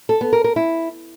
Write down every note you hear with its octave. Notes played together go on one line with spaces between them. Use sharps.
A4
B3
A#4
A#4
E4